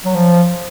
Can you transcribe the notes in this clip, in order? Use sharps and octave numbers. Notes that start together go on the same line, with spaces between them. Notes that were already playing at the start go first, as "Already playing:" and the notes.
F#3
F3